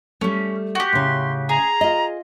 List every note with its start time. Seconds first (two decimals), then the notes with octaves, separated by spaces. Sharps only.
0.21 G3 A3 C#4
0.75 F#4 G4
0.93 A2 C#3 C6
1.49 G#4 A#5
1.81 F4 D#5